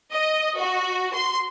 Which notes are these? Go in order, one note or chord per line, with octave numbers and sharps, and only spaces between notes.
D#5
F#4
C6